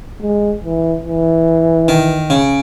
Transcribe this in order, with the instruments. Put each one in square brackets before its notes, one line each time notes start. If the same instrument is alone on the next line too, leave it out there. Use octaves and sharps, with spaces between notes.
[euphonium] G#3
E3
E3
[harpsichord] D#3
C#3